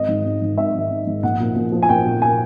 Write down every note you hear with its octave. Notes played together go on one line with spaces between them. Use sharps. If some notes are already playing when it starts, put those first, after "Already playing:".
Already playing: G#1 D#5
G#2 D#3
G#1
G#2 D#3
G#1 E5
G#2 D#3
G#1
G#2 D#3
A#1 F#5
A#2 F3
A#1
A#2 F3
G#5
A#1 G5
A#2 F3
G#5